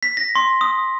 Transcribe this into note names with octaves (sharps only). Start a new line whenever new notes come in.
B6
A#6
C6
D#6